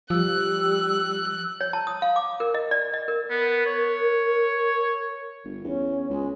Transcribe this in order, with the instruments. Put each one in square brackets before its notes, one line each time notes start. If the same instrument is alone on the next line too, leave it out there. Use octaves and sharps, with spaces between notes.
[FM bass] F3 [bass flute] G3 [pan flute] E6 [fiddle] F#6
[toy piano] C#5
A5
D#6
F5
D6
A#4
D#5
D5
D#5
A#4
[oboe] B3 [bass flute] A#4
[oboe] C#5
[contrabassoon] G1
[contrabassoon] E2 [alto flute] C#4
[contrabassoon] C#2 [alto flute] G#3